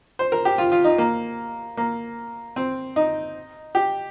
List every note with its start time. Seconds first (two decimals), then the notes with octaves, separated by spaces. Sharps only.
0.19 C5
0.32 A#4
0.45 G4
0.58 F4
0.72 F4
0.84 D#4
0.98 A#3
1.77 A#3
2.56 C4
2.96 D#4
3.75 G4